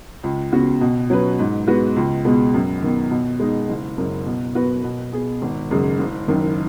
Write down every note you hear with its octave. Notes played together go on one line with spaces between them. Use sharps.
C#2
C#3 B3 F#4
B2
F#3 C#4 B4
G#2
G#3 B3 F#4 B4
C#2
B2 G#3 B3
F#2
D#3 B3
B2
G#3 B3 D#4
F#1
F#2 C#3
B2
B3 F#4 B4
B2
B3 G#4
G#1
F#2 C#3 G#3
F#1
F#2 D#3